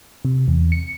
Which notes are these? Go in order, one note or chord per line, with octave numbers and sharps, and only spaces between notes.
C3
E2
C#7